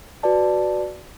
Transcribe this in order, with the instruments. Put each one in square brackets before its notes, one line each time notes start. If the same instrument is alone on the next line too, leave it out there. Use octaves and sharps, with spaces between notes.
[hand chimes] F#4 B4 D5 A5